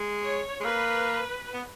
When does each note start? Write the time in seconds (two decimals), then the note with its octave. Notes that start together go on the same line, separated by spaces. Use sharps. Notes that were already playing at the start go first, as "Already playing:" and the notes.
Already playing: G#3
0.24 C#5
0.60 G#3
0.64 A#3 B4
1.54 B3